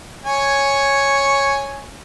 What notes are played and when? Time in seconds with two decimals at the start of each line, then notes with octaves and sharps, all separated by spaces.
0.25 C#5 G#5